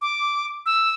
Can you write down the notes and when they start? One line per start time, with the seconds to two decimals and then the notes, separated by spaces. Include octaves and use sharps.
0.02 D6
0.66 E6